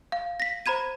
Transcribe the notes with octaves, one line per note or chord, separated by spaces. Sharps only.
F5
A#6 B6
C5 A#5 B5 G#6 D#7